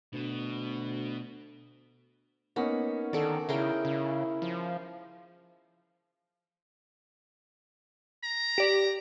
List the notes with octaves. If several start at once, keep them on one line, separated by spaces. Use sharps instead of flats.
D2 B2
A#3 B3 C#4 D#4
D3 D#3 A4 D5
C#3 E4 G#4 A#4 G5
C#3
F3
A#5
G4 D5